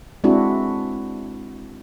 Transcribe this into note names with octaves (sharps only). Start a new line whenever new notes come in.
G#3 C4 D4 E4 F#4